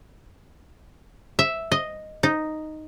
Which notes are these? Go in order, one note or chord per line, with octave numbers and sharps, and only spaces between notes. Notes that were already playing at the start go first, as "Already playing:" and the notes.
E5
D#5
D#4